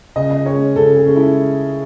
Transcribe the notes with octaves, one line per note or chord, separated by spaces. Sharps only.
C#3 D#5
D#5
G#3 C#4 C#5
C#3 A4
G#4
G#3 C#4
E4